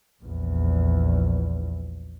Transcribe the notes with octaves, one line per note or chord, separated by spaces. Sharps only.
A#1 E2